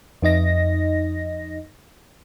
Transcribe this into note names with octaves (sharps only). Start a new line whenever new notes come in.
F2 D#4 D#5 A#6